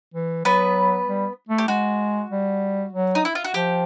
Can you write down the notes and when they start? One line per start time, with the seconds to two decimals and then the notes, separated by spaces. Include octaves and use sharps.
0.14 E3
0.45 F#3 B3 B4
1.07 G3
1.49 A3
1.58 G4
1.68 G#3 F#4
2.31 G3
2.93 F#3
3.15 D#4
3.25 E4
3.35 F4
3.44 F#4
3.54 F3 G4